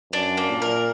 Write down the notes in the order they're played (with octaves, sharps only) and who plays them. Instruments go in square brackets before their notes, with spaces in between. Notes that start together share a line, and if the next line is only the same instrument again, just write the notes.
[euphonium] F#2 [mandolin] D4
[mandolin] A#3
[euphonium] A#2
[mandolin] A#4